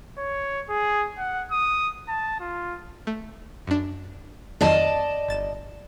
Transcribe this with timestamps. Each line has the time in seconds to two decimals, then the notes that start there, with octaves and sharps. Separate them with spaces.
0.18 C#5
0.69 G#4
1.18 F#5
1.51 D#6
2.09 A5
2.40 F4
3.07 A3
3.67 F#2 D4
4.61 F2 D#3 F#3 D5 D#5 A5
5.28 G1 A6 E7